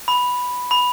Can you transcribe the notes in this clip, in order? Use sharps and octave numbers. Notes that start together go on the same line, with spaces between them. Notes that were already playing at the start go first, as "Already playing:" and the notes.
B5
B5